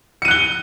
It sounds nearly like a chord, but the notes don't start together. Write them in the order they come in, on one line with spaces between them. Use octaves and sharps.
C#7 D#7 F#6 G7